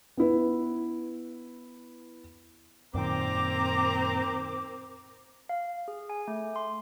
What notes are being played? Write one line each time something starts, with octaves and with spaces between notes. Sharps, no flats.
B3 E4 B4
F#2 A#2 D#3 C4 A#4 C5 A#5 D6
F5
G#4
G#5
A3
C6